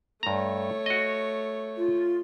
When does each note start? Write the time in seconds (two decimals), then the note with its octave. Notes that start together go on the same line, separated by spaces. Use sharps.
0.23 G2 A3 C#5 A#5
0.86 F#4 D#5
1.76 F4